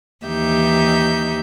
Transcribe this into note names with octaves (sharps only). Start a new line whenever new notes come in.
D#2 E3 D#4 G4 E5 G6